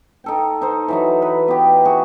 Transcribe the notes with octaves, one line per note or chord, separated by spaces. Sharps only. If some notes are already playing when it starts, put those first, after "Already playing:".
D#4 A4 G5
D#4 C5
E3 F#3 D#4
B4
B3 G4
F#4 G#4